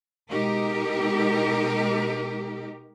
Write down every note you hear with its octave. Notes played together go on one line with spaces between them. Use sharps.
B2 G#3 D#4 G4 A#4